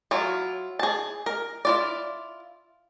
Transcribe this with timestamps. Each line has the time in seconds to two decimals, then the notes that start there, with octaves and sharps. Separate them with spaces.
0.11 F#3 E4 F4
0.79 G#4 A5
1.26 A#4
1.65 E4 F4 D5